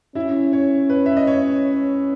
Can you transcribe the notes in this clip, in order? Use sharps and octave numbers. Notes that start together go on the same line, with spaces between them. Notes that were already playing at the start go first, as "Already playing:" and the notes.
C#4 E4 E5
C#5
B4
E5
D#5
C#5